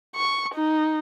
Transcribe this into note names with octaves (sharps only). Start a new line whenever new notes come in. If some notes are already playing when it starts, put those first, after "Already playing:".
C#6
D#4